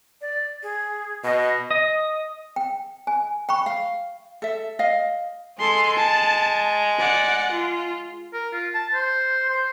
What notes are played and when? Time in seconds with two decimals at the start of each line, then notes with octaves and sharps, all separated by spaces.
0.21 D5
0.63 G#4
1.24 B2 D#5
1.71 D#5
2.56 G5
3.07 G#5
3.49 G5 B5 C#6
3.66 F5
4.42 A4 E5
4.79 D#5 F5
5.59 G#3 A4 C6
5.97 A5
6.99 D5 F#5
7.52 F4
8.34 A#4
8.53 F4
8.74 A5
8.94 C5
9.50 C5